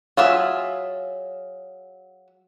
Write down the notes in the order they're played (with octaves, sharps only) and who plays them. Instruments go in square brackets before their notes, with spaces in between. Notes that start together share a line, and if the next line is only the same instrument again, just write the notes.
[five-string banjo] F#3 F4 G#4 E5